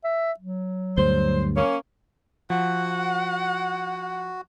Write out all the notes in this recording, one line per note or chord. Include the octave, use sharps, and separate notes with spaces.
E5
F#3
D2 G2 C5
A#3 C#4
F3 F#4 F#5